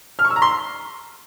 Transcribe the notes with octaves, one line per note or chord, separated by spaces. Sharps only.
F6
C#6
E6
A#5
C6